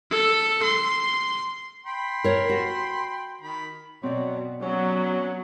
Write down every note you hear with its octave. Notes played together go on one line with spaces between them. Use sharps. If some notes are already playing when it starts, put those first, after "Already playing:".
A4
C6
G5 B5 C6
A#4 C#5
F#4
D#3 B5
B2 F#3 C4 D5
F#3 B3 C#4